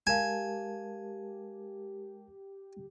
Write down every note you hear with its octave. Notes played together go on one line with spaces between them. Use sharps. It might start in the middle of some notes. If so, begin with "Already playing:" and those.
G#3 G4 A#4 F5 G#5 A5 E7